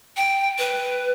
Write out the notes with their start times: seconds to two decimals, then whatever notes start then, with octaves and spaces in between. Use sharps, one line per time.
0.17 G5
0.58 B4